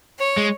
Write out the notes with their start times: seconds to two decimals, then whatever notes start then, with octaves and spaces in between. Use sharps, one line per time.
0.18 C#5
0.37 G#3